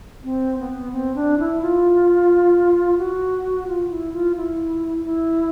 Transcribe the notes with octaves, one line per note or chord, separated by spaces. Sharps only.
C4
B3
C4
D4
E4
F4
F#4
F4
E4
F4
E4
E4